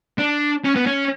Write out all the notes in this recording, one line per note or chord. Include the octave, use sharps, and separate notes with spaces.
D4
C#4
B3
C#4